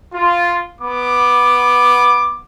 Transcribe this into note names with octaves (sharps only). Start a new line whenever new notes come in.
F4
B3 D6